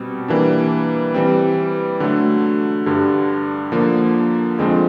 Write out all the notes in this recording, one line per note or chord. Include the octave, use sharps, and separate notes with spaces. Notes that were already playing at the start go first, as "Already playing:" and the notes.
Already playing: B2 G3 C4
E3 G3 A#3 D4
E3 G3 C4
D3 F#3 A3
G2 D3 G3
D3 F3 A#3
F2 D3 F3 G#3 C4